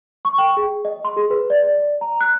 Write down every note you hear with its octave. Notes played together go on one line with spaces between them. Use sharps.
C#6
G5
G#4
D#5
C6
G#4
B4
D5
D5
A#5
F#6